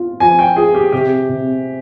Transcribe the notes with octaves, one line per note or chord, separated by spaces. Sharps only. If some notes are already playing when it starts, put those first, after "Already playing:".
Already playing: F4
F3 G#5
G5
F4 G#4
G4
C3 G4
C3